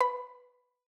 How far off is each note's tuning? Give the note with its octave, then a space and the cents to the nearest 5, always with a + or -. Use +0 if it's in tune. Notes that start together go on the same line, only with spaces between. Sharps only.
B4 +0 B5 +5